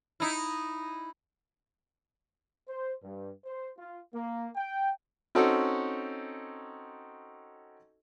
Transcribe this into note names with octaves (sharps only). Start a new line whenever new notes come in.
D#4 E4
C5
G2
C5
F4
A#3
G5
C4 C#4 D#4 F#4 A4